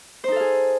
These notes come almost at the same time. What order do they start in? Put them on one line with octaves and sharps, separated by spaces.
C5 D#4 A4 F5 G#4